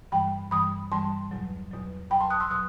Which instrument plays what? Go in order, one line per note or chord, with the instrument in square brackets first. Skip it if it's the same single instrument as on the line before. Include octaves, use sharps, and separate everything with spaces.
[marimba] G2 E3 G3 G5 B5
G2 E3 G3 B5 D#6
G2 E3 G3 A5 C6
E2 B2 F#3
E2 B2 F#3
E2 B2 F#3 G5 B5
A5 C6
D#6 F#6
C6 E6
B2 F#3 D#6 F#6